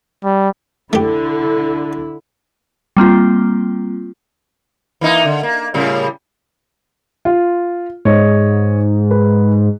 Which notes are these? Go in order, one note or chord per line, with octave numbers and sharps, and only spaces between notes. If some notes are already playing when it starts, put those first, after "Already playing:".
G3
D3 A3 E4 G4
G3 A#3 C4 F4
E3 A#3 D#4
D3
A#3
A2 C#3 G3
F4
G#2 C#5 D#5
B4